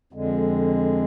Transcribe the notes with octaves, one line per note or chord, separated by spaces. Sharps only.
F2 D3 G#3